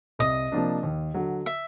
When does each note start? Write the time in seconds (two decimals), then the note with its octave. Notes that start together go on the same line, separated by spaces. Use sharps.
0.19 C2 D#5
0.52 C3 F3 A#3 D4
0.83 D#2
1.14 D3 F#3
1.46 E5